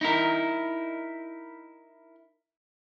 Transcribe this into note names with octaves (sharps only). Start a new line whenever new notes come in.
D#4 E4 A#4